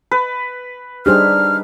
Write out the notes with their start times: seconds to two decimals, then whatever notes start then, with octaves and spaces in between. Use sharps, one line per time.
0.11 B4
1.06 G3 D4 D#4 G4 G#4 C5 F6